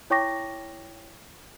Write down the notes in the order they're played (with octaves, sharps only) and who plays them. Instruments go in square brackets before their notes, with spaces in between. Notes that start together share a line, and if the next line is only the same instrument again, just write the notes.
[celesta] E4 C#5 G5 C#6 D6 A#6